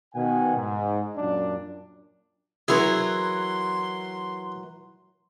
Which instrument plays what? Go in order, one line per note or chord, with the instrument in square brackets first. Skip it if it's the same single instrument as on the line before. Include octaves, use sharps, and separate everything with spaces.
[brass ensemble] B2 D#3 F#5 G#5
G#2
F#2 A#2 D4
[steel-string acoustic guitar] E3 F#3 A#4 [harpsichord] E4 G#4 [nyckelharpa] C6